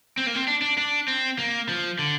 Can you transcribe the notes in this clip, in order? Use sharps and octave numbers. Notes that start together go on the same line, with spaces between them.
C4
A#3
C4
D4
D4
D4
C4
A#3
F3
D3